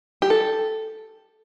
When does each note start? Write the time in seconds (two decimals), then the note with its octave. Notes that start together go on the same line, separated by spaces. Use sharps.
0.22 G4
0.30 A4